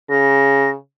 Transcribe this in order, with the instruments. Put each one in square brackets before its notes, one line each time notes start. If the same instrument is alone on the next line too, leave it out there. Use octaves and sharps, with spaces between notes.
[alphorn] C#3 [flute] A#6